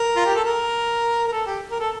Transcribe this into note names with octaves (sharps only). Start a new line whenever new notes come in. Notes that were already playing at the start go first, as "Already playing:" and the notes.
Already playing: A#4
F4
G4
A4
A#4
A#4
A4
G4
A#4
A4